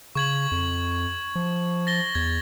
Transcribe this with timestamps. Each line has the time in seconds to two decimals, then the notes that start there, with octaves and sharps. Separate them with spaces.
0.15 C#3 C#6 G#6 F#7
0.51 F2
1.35 F3
1.87 A6 A#6 G7
2.15 E2 G#6